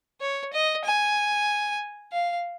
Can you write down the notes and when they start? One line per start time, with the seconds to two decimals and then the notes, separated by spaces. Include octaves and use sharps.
0.20 C#5
0.52 D#5
0.84 G#5
2.12 F5